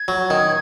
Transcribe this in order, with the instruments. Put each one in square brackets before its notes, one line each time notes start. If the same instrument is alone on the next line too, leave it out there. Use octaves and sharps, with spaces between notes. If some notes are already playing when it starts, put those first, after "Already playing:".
Already playing: [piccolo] G#6
[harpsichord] F#3
D#3